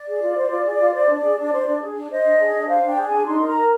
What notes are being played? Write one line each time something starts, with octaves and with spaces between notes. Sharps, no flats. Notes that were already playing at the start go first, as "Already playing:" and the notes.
Already playing: D5
G#4
F4
C5
F4
G#4
F4
C5
D4
G#4
D4
C5
D4
G#4
D4
C5 D#5
D4
G#4
D4
C5 F5
D4 G5
G#4
G5
D4 G#5
D#4 C6
A#4
A#5
A#4